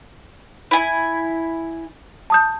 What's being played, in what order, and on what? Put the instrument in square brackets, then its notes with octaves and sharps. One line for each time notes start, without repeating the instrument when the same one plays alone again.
[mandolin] E4 G#5
[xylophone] A5 D#6 G6